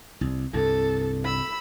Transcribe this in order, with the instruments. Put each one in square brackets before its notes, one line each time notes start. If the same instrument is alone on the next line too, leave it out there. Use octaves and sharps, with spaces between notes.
[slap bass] C2
[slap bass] C2 G2 [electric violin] A4
[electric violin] B5 E6